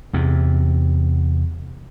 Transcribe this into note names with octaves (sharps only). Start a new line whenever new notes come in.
E2 C3